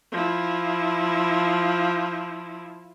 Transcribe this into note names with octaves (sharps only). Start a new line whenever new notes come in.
F3 E4